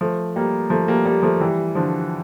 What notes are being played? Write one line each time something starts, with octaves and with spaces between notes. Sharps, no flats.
F3 A3
G3 A#3
F3 A3
G3 A#3
G3 A#3
F3 A3
E3 G3
D3 F3